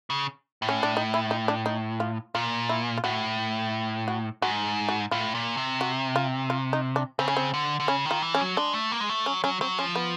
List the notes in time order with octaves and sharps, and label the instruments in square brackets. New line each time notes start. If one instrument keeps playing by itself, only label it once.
[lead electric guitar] C#3
A2
[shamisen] C#4
D4
D#4
E4
D#4
D4
D#4
F4
[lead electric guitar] A#2 [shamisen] F4
[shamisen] E4
F4
[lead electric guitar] A2 [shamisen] F#4
[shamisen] F#4
[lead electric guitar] G#2 [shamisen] F#4
[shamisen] F#4
[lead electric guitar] A2 [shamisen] F4
[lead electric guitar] A#2
C3
[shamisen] F#4
F4
F4
D#4
D4
[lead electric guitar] C#3 [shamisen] C4
[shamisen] C#4
C4
[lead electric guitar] D3
D3
[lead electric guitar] C#3 [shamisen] C#4
[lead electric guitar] D#3
[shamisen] F4
[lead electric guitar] E3
[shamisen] C#4
[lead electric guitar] F#3
[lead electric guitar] G#3 [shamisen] D4
[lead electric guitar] A3
A#3
G#3
A3
[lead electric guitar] F#3 [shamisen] C#4
[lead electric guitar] F#3 [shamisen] C#4
[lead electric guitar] F#3 [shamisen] C4
[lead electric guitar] F3 [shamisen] C#4
[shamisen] B3